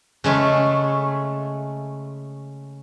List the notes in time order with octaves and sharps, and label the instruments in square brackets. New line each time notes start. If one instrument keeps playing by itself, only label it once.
[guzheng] C#3 G#3 A3